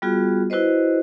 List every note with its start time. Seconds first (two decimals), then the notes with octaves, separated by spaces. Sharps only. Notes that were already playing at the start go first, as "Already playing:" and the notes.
0.02 G3 B3 F4 F#4 G#4
0.50 E4 F#4 B4 C5 D#5